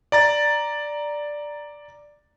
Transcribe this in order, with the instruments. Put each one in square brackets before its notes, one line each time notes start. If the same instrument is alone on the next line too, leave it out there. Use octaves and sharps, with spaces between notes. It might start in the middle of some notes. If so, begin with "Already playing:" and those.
[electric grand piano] D5 A#5 A6